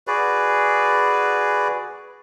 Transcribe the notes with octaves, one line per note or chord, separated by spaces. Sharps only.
F#4 G#4 B4 D5